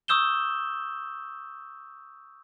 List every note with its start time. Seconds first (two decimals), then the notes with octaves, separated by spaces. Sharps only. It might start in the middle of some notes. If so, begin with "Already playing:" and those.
0.08 C#6 D#6 E6 G6 E7 G7